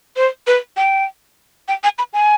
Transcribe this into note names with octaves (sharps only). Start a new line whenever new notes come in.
C5
B4
G5
G5
G#5
B5
G#5